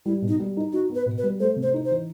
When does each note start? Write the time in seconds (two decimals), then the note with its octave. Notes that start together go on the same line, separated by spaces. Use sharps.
0.06 G3 E4
0.22 B2
0.28 D#4
0.40 G3
0.57 D#4
0.73 D#4 F#4
0.90 B3
0.95 B4
1.06 B2
1.18 B4
1.23 G3
1.40 A3 C5
1.56 C3
1.63 C5
1.74 D#4
1.85 C5
1.91 E3